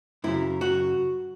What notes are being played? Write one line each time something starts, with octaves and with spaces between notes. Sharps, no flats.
F#2 C#3 F#3 E4
F#4